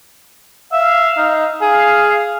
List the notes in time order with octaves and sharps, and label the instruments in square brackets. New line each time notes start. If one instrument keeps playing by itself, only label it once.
[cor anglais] E5 [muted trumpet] F5
[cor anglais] D#4
[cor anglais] G#4 [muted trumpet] F5